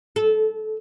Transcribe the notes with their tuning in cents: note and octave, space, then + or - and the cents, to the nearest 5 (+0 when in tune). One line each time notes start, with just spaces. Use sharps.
A4 -25